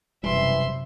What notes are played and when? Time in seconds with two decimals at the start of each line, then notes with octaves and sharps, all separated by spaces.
0.24 E1 F#2 C3 E3 G3 E5 C6